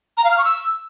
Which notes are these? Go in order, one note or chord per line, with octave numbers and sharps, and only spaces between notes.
A#5
F5
F6
C#6
E6